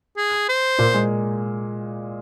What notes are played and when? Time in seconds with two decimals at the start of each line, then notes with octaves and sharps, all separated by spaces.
0.17 G#4
0.49 C5
0.79 A#2 A#3
0.94 G#3